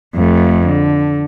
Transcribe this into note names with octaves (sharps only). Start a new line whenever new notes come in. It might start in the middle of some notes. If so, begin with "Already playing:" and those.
F2 A3
D3